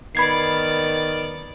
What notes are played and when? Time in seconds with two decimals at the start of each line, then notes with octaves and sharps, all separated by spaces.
0.15 D#3 B3 D5 B5 G#6 C7